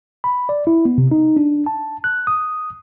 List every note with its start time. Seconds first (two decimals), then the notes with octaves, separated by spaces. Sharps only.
0.24 B5
0.49 D5
0.67 E4
0.85 B3
0.98 C3
1.11 D#4
1.37 D4
1.66 A5
2.04 F#6
2.27 D#6